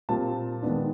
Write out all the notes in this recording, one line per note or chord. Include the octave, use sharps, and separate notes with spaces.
A#2 G3 C4 A5
D#3 G#3 B3 D4